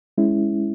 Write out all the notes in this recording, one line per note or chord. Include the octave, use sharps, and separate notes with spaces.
G#3 C#4 E4